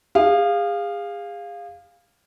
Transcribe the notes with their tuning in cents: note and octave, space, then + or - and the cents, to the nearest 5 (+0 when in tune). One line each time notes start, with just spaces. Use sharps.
G#4 -35 F5 +0